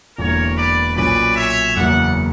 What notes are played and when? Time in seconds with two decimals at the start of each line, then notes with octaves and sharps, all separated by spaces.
0.17 E1 E2 D3 A#3 A#4 C#5
0.57 B4 D5
0.96 B1 A#2 F#3 C#4 B4 D5
1.36 C#5 E5
1.76 F#1 E2 C#3 F#3 A#3 D5 F#5